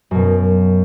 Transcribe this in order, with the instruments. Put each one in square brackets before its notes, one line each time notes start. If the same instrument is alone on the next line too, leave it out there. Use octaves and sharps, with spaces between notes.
[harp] F#2 B2